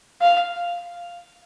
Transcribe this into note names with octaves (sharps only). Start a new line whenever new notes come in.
F5